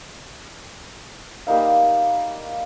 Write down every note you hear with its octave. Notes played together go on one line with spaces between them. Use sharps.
G3 A#3 D#4 F5